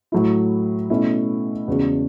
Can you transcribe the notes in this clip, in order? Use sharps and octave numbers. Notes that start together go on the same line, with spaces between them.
A2 F#3 A3 E4
B2 A3 C#4 E4
E2 C#3 G#3 C#4 F#4